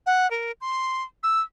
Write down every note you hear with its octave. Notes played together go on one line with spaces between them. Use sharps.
F#5
A#4
C6
E6